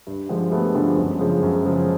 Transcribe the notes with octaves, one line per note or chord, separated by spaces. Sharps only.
G2
D3 F3 G#3
G2 A3 B3
D3 F3 G#3
F#2
C#3 F3 G#3
F#2
C#3 F3 G#3